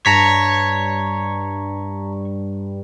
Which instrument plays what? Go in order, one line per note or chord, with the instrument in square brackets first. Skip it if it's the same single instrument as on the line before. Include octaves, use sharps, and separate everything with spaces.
[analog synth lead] G2 [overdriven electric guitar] C#5 [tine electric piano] A5 A#5 B6